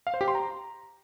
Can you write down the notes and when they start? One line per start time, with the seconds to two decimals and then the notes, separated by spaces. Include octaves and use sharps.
0.07 F5
0.14 C5
0.21 G4
0.28 C6
0.35 A#5